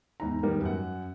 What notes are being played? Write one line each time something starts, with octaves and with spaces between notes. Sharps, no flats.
E2 G#2 D#4 A#5
D#3 G3 B3 G4 A#4
F#2 F#5